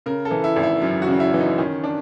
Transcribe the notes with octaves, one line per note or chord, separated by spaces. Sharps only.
C#3 A#4
A4
E3
E4
G#1
E4
F#2
F#4
C#3
E4
E3
D#4
D#3 C#4
D4